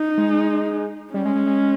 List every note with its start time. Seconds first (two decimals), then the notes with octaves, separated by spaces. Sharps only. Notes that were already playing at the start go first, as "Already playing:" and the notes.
Already playing: D#4
0.18 G#3
1.14 G3 C#4
1.25 G#3
1.35 G#3
1.46 G#3